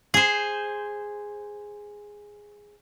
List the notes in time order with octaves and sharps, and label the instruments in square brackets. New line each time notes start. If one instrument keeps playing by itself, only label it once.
[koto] G#4 C5